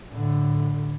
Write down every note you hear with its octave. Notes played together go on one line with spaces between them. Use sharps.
A2 D3